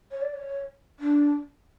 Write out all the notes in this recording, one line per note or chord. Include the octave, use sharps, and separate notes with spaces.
C#5
D5
C#5
D4